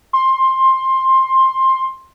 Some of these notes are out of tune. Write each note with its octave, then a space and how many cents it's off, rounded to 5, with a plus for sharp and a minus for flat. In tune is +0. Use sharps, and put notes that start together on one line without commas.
C6 +15